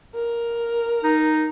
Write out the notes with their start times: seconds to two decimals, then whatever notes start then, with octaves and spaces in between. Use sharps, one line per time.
0.15 A#4
1.04 D#4